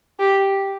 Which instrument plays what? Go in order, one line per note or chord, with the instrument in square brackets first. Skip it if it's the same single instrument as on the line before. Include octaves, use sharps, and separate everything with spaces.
[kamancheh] G4